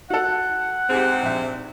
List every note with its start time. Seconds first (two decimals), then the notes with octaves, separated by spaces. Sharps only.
0.10 F#4 A4 F#5
0.90 G#2 C3 C4 G4 G#4
1.22 A#1 E5